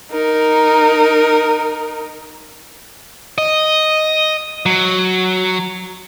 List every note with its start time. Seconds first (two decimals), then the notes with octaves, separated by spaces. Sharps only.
0.11 D#4 A#4
3.38 D#5
4.66 F#3